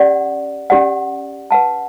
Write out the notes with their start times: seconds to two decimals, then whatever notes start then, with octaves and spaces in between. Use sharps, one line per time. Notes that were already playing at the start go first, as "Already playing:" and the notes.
Already playing: C#4 G4 D5 F#5
0.70 C#4 G4 D5 F#5
1.51 B4 F#5 A5